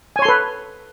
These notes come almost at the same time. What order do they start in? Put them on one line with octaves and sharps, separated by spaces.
G#5 C#5 C6 A4 B4